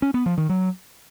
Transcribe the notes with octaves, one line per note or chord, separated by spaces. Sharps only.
C#4
B3
F3
D#3
F#3